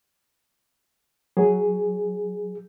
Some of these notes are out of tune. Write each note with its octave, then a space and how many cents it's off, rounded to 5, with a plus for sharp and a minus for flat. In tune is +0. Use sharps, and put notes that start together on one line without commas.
F#3 +5 G#4 +0